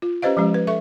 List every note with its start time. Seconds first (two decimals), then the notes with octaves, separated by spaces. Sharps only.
0.02 F4
0.22 C#4 G4 B4 C5 D#5 F5
0.37 F3 G#3 C#4 G4
0.54 B4
0.67 A4 E5 C#6